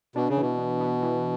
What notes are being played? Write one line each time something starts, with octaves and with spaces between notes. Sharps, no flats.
B2 D4
C#3
B2 E3
B3
B3
E3